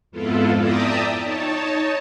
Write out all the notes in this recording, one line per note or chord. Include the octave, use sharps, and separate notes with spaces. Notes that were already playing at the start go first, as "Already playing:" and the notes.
F2 G#2 B3 E4 F4 A4
D5 E5 G5 A5 A#5 D#6
D#4 C#5 A5